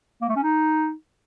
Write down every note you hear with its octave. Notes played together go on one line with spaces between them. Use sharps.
A#3
A3
C#4
D#4